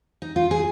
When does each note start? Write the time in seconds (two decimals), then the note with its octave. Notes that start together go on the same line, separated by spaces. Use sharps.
0.22 D#4
0.36 F4
0.51 G#4